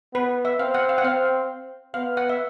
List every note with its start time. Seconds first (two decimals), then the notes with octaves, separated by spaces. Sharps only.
0.14 B3 B4
0.45 E5
0.59 C4 F5
0.74 F#5
0.89 F5
0.98 F#5
1.04 C4 F5
1.94 B3 F5
2.17 F#5
2.29 E5